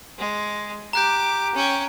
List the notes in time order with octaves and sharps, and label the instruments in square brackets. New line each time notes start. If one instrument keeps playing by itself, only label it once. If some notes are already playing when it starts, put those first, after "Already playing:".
[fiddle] G#3
[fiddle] G4 D6 [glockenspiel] A#5 F#6 G6
[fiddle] C#4 G5